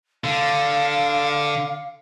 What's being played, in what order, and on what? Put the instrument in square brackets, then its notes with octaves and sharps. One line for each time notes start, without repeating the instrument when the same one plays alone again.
[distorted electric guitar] D3 [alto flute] F5